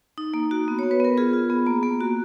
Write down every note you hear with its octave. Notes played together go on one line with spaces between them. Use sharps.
D#4
A#3
F#4
B3
B3 C#5
B4
B3 A#4
F4 G#4
F4
B3
A#3
A#3
F#4